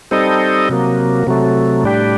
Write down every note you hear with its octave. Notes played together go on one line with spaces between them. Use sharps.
G3 C4 D#4 A4 D#5
C3 F#3 A#3
C3 F#3 A3
A2 G3 D4 G4